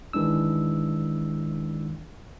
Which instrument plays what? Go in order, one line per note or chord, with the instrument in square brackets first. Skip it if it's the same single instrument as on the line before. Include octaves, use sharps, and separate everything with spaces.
[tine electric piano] G1 D#3 E3 G#3 D4 E6